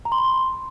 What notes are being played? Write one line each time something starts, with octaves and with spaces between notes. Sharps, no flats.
A#5
C6
B5
C6